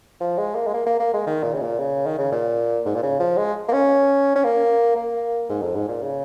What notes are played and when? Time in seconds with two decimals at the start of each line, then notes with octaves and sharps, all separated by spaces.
0.20 F3
0.38 G#3
0.55 A#3
0.67 G#3
0.74 A#3
0.86 A#3
1.00 A#3
1.13 G#3
1.27 D#3
1.43 A#2
1.54 C#3
1.62 A#2
1.79 C#3
2.06 D#3
2.18 C#3
2.32 A#2
2.85 G#2
2.95 A#2
3.03 C#3
3.19 F3
3.37 G#3
3.68 A#3
3.73 C#4
4.35 C#4
4.44 A#3
4.96 A#3
5.49 G#2
5.62 F2
5.75 G#2
5.88 A#2
6.03 C#3